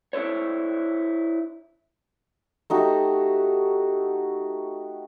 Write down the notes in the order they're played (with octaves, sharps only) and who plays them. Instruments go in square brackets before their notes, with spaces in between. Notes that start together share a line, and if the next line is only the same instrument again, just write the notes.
[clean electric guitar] D4 E4 A4 C5 C#5
[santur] A3 D#4 F#4 G4